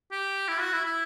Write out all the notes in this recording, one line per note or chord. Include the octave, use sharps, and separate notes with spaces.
G4
E4
F#4
E4
E4